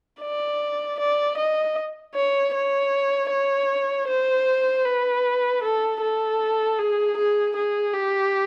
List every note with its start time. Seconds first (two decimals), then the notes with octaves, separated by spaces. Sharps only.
0.21 D5
0.99 D5
1.37 D#5
2.14 C#5
2.54 C#5
3.30 C#5
4.08 C5
4.85 B4
5.62 A4
6.01 A4
6.79 G#4
7.17 G#4
7.55 G#4
7.94 G4